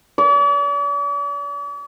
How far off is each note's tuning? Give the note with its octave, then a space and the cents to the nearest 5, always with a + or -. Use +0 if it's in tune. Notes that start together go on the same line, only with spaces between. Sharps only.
D5 -45